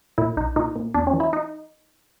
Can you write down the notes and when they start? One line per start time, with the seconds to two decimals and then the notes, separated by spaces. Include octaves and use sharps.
0.18 A#2 E4
0.37 B1 D#4
0.56 A#2 D#4
0.76 A#2
0.94 E2 D4
1.07 C#4
1.14 E3
1.20 E4
1.33 D#4